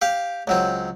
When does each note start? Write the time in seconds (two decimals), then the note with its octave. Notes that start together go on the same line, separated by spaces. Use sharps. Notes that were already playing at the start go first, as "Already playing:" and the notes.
0.02 G4 F5
0.47 C#2 F#3 C4